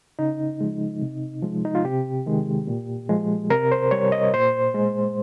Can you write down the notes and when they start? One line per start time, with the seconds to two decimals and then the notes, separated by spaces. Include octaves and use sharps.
0.19 C#3 D#4
0.61 F3 G#3
1.01 C3
1.43 F3 G#3
1.65 D#4
1.75 F4
1.85 C3 G4
2.26 D#3 G#3
2.67 A#2
3.09 F3 G#3
3.50 C3 A#4
3.72 C5
3.91 G3 C#5
4.12 D#5
4.34 A#2 C5
4.74 G#3